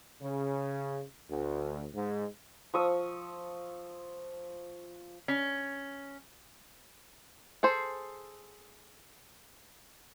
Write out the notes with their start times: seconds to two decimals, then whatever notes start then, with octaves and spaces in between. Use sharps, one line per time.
0.22 C#3
1.30 D2
1.94 G#2
2.74 F3 C#6 D#6 E6
5.28 C#4
7.63 G#4 A4 C5